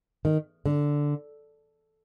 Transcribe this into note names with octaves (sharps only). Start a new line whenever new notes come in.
D#3
D3